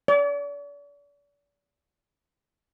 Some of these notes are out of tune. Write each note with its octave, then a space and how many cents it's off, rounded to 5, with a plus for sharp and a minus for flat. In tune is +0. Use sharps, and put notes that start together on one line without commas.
D5 -40